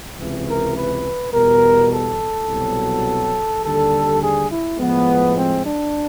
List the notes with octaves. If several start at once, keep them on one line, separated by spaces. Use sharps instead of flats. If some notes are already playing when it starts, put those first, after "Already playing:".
C#2 C3 E3
A#4
B4
E2 B2 G3 A#4
A4
C2 B2 F#3
D#2 D3 G3 A4
G#4
E4
A2 F3 G#3 B3
C4
D4